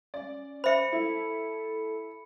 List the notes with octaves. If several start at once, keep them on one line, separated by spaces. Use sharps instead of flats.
C#4 D5
C5 E5 B5 C#7
E4 A4